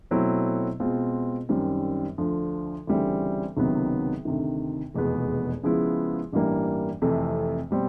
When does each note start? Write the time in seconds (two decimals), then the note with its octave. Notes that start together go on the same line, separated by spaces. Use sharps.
0.11 B2 F#3 A3 C4 E4
0.80 B2 G#3 C4 F4
1.49 F#2 D#3 G3 C4
2.18 D2 D3 F3
2.87 D2 C#3 E3 G3 C4
3.57 C#2 C3 D#3 F#3 B3
4.25 D2 C3 D#3
4.94 F1 E2 B2 G#3 B3
5.63 C#3 F3 G#3 B3 E4
6.32 A1 G2 E3 G3 A#3
7.02 F2 C3 E3 A3
7.70 B2 G3 C4